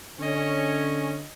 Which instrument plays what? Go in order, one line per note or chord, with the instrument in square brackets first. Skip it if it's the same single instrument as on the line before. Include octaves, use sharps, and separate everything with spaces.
[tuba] D3 [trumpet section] C#4 [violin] C#5 D#5